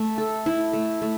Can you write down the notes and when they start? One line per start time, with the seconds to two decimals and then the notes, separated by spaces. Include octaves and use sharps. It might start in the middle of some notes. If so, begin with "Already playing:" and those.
Already playing: A3
0.18 A4
0.46 E4
0.73 A3
1.02 A3